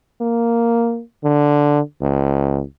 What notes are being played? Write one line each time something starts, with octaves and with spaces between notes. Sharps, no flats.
A#3
D3
C#2